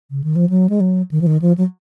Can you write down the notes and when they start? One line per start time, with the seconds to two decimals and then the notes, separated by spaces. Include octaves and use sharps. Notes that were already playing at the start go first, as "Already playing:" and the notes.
0.11 C#3
0.24 D#3
0.36 F3
0.49 F#3
0.69 G#3
0.80 F#3
1.11 D#3
1.21 F3
1.27 D#3
1.42 F3
1.58 F#3